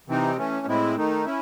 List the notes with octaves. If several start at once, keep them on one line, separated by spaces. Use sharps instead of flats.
C3 E3 C4 D#4
E3 A3 C#4
A2 G#3 C4 E4
D#3 A3 D#4
C#4 E4